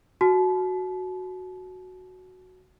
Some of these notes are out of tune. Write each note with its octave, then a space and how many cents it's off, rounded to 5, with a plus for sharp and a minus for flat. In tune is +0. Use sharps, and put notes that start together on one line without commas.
F#4 +0 A5 -35